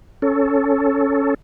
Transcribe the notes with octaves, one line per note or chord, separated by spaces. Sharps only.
C#4 A4